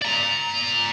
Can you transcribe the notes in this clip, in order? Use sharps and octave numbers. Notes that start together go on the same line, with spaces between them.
D5 A#5